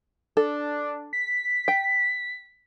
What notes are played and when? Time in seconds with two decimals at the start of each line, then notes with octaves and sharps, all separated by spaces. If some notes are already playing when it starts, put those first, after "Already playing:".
0.37 D4 A4
1.13 B6
1.68 G5